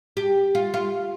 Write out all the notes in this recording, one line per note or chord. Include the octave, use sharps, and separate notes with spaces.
G4
F4
F4